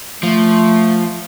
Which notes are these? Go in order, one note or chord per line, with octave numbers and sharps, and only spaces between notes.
F3 A3